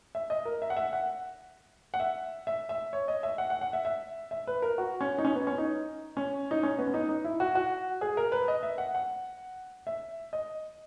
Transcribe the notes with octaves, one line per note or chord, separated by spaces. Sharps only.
E5
D#5
A#4
E5
F#5
E5
F#5
F#5
E5
E5
E5
C#5
D#5
E5
F#5
F#5
F#5
E5
E5
E5
B4
A#4
F#4
C#4
D#4
C#4
B3
C#4
D#4
C#4
D#4
C#4
B3
C#4
D#4
D#4
E4
F#4
F#4
G#4
A#4
B4
D#5
E5
F#5
F#5
E5
D#5